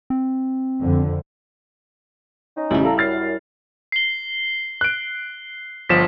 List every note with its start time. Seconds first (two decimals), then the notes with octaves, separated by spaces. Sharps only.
0.10 C4
0.81 F2 D3
2.56 C#4 D#4
2.70 A1 C#3 G3 E4
2.85 A4 D5 F5 A#5
2.98 F#2 F6 A6 C7
3.92 C7 G7
4.81 F#6 D7
5.89 G1 F3 B6 E7